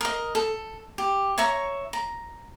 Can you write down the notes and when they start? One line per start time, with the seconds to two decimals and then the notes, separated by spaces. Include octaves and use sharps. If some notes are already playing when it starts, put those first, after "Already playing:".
0.01 A#4 D#5
0.35 A4
0.98 G4
1.38 C#5 E5 A#5 C#6
1.93 A#5